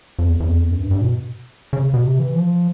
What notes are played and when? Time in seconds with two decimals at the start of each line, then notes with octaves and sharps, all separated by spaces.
0.19 F2
0.30 E2
0.40 E2
0.49 F2
0.60 E2
0.71 F#2
0.80 G2
0.91 G2
1.01 B2
1.73 C#3
1.94 B2
2.03 C3
2.19 E3
2.35 F3